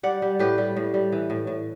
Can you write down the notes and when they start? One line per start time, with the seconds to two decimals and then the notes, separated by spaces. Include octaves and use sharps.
0.03 G3 D5 F#5
0.22 G3
0.39 A2 G4 B4
0.58 G3
0.76 A2
0.94 G3
1.12 E3
1.30 A2
1.47 A2